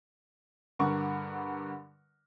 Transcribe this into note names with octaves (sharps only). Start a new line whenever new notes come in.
G2 D3 A#4 F#5 C#6